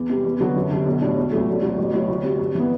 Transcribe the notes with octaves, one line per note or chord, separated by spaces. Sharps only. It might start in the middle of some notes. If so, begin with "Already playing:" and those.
Already playing: E2
C3 G3
E2
D3 F#3 B3 F#4
F#2
D3 G3
B1
A2 G3 D4
E1
D2 C3 F#3 A3
E1
D2 C3 F#3
A1
A2 F#3
D2
C3 G3
G2
E3 B3